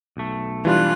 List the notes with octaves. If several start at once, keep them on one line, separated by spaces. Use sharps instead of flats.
B1 A3
E3 G3 D4 F4 F#6